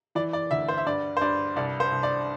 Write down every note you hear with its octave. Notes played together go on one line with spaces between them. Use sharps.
E3 D5
D5
D2 E5
C5
E5
G2 D5
C5
G2 D5
C2 D5
C5
C2
D5